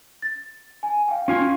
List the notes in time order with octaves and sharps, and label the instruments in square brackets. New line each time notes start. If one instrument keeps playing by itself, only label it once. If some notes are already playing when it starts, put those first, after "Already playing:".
[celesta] A6
G#5
F5 G5
[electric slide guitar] C#4 F4 G#5